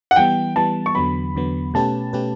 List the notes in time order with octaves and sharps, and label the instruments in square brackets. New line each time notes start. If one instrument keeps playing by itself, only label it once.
[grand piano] F#5
[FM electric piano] E3 G3 B3 [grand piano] G5
[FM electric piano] E3 G3 B3 [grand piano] A5
[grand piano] C#6
[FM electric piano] E2 D3 F#3 B3 [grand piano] B5
[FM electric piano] E2 D3 F#3 B3
[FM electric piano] B2 A3 C#4 G4 B4 [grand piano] A5
[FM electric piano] B2 A3 C#4 G4 B4